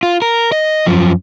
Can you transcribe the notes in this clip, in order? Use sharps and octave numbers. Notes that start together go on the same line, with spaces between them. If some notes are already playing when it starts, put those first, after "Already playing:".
F4
A#4
D#5
F#2 F3